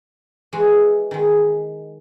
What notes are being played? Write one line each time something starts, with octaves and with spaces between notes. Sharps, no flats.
E3 G#3 F#4
D#3 G#3